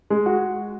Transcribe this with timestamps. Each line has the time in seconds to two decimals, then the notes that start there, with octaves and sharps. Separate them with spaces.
0.10 G#3
0.26 F#4